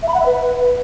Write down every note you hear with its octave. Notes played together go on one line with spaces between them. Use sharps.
E5
B5
F#5
E5
B4